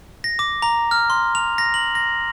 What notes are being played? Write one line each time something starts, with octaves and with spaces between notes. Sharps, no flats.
A#6
D6
A#5
F6
C6
F7
A#6
F#7
A#6